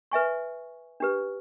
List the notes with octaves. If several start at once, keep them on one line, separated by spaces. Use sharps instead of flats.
B4 E5 G#5 C#6
D4 G4 B4